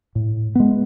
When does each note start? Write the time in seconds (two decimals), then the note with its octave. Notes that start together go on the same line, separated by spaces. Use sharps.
0.15 A2
0.55 G#3 B3